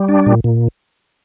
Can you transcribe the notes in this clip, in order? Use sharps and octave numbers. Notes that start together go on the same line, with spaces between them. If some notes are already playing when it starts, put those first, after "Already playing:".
Already playing: G3
D4
A#2
A#2